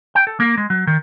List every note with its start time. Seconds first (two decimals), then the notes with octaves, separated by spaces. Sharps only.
0.15 G5
0.27 A4
0.40 A#3
0.57 G#3
0.70 F#3
0.87 D#3